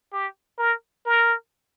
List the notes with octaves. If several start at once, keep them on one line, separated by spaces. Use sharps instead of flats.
G4
A#4
A#4